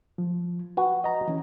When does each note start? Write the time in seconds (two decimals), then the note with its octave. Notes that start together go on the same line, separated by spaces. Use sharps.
0.18 F3
0.77 F#4 B4
1.04 D#5 A#5
1.28 E3 C#4